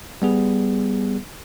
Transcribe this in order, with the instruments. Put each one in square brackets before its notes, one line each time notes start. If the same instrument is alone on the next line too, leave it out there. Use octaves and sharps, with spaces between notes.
[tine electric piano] G3 B3 G#4